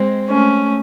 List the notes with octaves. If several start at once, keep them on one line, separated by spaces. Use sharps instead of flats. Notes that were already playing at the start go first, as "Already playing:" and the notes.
Already playing: G#3 C4
A3 C#4